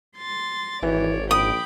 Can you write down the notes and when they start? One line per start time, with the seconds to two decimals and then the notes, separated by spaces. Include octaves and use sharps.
0.16 C6 A6 A#6
0.82 G#1 E3 C#5 D5
1.31 A#1 G5 B5 D6 D#6